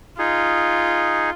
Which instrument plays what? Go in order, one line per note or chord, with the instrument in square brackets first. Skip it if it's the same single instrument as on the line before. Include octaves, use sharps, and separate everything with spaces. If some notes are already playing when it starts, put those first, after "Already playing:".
[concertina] D#4 G#4 [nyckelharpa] F4